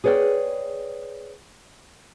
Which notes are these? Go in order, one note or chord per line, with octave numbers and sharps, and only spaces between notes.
G#4 B4 C#5 D5 G5